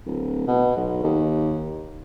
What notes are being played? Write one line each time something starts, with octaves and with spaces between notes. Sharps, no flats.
D1
B2
B1
D#2